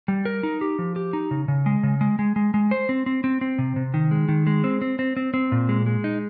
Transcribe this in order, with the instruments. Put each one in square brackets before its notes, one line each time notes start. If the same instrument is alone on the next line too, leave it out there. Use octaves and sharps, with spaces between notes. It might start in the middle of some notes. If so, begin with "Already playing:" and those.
[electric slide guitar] G3
A#4
D#4
G4
F3
G4
D#4
C#3
C#3
G#3
C#3
G#3
G#3
G#3
G#3
C5
C4
C4
C4
C4
C3
C3
D#3
G#3
D#3
G#3
C4
C4
C4
C4
C4
A#2
G#3
G#3
D#4